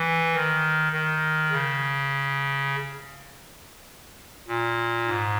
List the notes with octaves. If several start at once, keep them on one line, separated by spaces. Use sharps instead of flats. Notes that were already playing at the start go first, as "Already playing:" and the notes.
Already playing: E3
D#3
D#3
C#3
A#2
G#2